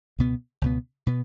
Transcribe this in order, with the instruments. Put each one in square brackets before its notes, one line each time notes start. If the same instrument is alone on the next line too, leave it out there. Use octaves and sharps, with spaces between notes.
[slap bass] C#2 B2 B3
C#2 B2 B3
B2 B3